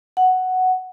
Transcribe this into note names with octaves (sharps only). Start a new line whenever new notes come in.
F#5